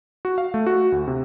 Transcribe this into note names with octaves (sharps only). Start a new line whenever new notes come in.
F#4
F5
A3
F#4
D2
C3